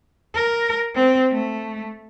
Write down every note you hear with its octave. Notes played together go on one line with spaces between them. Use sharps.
A#4
C4
A3